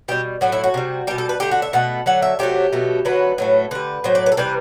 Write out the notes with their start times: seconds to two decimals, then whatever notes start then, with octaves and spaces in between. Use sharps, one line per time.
0.08 B2 G3 G4
0.41 A2 F#3 A3 F#4
0.52 E4
0.64 F#4
0.74 C3 G3
1.07 B2 G3 G4
1.18 A4
1.29 B4
1.40 D3 A3 G4
1.51 F#4
1.62 E5
1.73 B2 A3 F#5
2.06 D3 F#3 A3 F#5
2.22 E5
2.39 C3 F#3 A3 G4
2.73 B2 F#3 A3
3.05 D3 F#3 A3 B4
3.38 A2 F#3 A3
3.71 D3 G3 B4
4.04 A2 F#3 A3 C5
4.15 D5
4.26 B4
4.32 A4
4.37 C3 E3 G3 B4